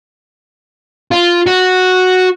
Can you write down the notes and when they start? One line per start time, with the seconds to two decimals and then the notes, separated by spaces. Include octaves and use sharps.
1.11 F4
1.47 F#4